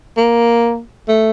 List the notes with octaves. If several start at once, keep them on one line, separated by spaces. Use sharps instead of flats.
A#3
A3